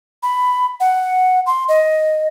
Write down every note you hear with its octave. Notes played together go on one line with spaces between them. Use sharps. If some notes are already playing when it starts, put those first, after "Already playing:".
B5
F#5
C6
D#5